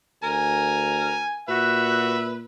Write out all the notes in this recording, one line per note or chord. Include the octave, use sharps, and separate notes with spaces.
D2 A#4 G#5
A#2 F#4 B4 E5